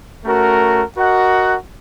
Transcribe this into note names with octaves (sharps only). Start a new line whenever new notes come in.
A3 C#4 F#4 A#4
F#4 A#4 D#5 F#5